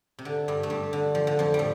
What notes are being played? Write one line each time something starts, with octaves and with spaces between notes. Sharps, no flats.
C3
D3
G2 G3
A3
G2 G3
D3
F3
D3
F2 F3
A2 G3